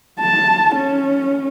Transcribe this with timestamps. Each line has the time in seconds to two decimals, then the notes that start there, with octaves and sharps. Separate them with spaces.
0.20 A5
0.75 C#4